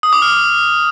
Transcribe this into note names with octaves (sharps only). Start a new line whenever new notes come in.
D#6
D6
F6